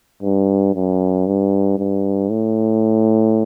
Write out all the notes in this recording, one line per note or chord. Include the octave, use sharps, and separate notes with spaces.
G2
F#2
G2
G2
A2